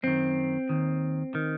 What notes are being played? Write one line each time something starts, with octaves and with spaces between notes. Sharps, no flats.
F#2 D#3 C4
D#2 D#3
D#3